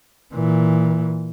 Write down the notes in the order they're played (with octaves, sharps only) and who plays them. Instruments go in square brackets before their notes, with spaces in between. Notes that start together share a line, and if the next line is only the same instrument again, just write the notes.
[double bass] A#2 E3